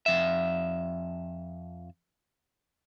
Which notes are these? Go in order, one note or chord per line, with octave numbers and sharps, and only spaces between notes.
F2 E5